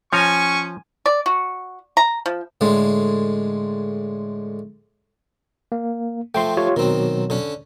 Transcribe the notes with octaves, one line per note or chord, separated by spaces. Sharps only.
F3 C#4 C#5 G#5 A#5 C#6
D5
F#4
A#5
F3
A2 D3 G#3
A#3
F3 A3 G5 C6
F4 G4 C#5
B2 D#3 F#3 C4
D3 C#4